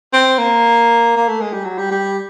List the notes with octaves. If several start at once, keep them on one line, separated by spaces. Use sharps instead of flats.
C4
A#3
A#3
A3
G#3
G3
F#3
G3
G3